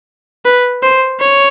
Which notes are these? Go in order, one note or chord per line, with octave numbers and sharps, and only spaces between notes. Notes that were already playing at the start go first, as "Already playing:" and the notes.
B4
C5
C#5